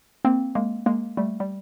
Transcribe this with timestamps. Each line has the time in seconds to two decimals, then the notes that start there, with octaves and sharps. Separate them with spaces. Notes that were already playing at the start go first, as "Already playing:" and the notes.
0.25 A#3 C4
0.55 G#3 A#3
0.86 G#3 A#3
1.17 G3 A3
1.40 G3